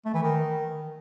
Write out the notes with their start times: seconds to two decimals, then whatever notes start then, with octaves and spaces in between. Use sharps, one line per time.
0.06 A3
0.14 E3
0.23 D#3